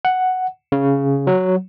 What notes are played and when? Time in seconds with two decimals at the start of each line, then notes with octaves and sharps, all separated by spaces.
0.05 F#5
0.72 C#3
1.27 F#3